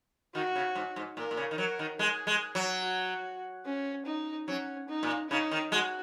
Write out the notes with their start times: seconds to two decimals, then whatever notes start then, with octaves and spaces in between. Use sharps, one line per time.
0.35 D#3 F#4
0.55 C#3
0.75 G#2
0.96 G#2
1.17 A#2 A#4
1.31 A#2
1.37 C#3
1.51 D#3
1.58 F#3 A#4
1.79 D#3
1.99 G#3 G#4
2.27 G#3
2.55 F#3
2.83 F#4
3.65 C#4
4.06 D#4
4.48 F#3 C#4
4.89 D#4
5.03 A#2
5.30 C#3 D#4
5.51 D#3
5.72 G#3 F#4